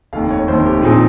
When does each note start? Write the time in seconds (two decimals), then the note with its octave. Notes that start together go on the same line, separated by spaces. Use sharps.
0.13 F1 D#2 D#3 F5
0.31 C#5
0.47 F1 D#2 D#3 C5
0.66 G4
0.82 A#2 F3 C4 D#4 G#4